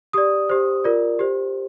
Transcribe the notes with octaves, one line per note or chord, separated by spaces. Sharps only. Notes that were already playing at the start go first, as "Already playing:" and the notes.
G4 D5 D#6
G4 C5
F4 A#4 D5
G4 C5